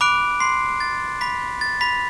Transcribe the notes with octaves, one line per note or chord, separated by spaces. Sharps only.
B5 D6 F#6 D7
C6 C7
A6
B5 B6
A6
B5 B6